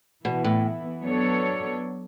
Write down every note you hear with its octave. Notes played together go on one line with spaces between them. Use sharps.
B2 E3 B3 E4
A2
F#3 B3 D4 A4 C#5